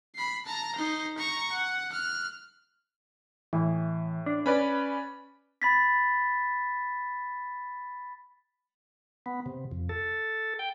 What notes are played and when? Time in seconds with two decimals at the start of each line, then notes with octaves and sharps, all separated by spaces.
0.15 B5 C7
0.46 A5 A#5
0.76 D#4 C5
1.18 A#5 C#6
1.52 F#5
1.92 F6 F#6
3.53 A2 E3
4.26 D4
4.46 C#4 B4 D5 B5
5.62 B5 A6 B6
9.26 B3
9.46 C3
9.72 F2
9.89 A4
10.59 G5